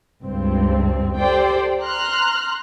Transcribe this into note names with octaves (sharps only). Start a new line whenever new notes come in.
C#2 G2 C4
G4 A4 C5 D5 G5
A#5 C6 F6 F#6